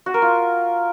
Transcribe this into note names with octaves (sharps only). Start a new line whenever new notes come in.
F#4
A#4
F4